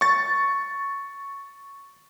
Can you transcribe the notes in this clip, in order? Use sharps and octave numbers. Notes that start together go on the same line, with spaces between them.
C#6 A6